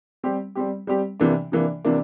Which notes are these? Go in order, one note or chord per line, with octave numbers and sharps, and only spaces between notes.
G3 C4 G4
G3 C4 G4
G3 C4 G4
C3 E3 A#3 D4
C3 E3 A#3 D4
C3 E3 A#3 D4